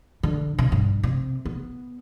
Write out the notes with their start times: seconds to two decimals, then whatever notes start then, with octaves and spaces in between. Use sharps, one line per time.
0.23 D3
0.58 C3
0.72 G2
1.03 C3
1.45 B3